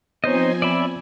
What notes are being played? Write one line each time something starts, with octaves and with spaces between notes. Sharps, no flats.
F3 B3 C4 D#4 C5 C#5 D#5 G#5
D5 E5 B5